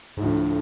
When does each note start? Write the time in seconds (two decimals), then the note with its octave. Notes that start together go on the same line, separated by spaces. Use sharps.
0.17 G#2
0.21 D2 A2 D3 F3